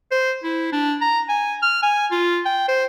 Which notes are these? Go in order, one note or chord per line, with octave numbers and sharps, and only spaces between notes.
C5
E4
D4
A#5
G#5
F6
G#5
F4
G5
C5